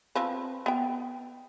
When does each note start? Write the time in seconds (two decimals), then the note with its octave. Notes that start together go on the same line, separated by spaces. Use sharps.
0.15 F3 C4 B4
0.66 B3 G5